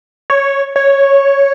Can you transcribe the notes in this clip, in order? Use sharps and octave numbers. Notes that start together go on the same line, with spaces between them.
C#5
C#5